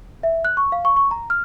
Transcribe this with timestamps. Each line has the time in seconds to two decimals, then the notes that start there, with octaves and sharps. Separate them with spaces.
0.23 E5
0.45 F#6
0.57 C#6
0.72 F5
0.85 C#6
0.96 C#6
1.11 A#5
1.30 F6